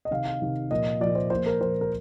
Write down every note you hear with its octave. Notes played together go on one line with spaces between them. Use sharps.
D#5
C3 D#3 F5
F5
C3 D#3
A#2 F3 D#5
A#2 F3 D5
C5
A#2 F3 C5
A#4
A#2 F3 C5
A#4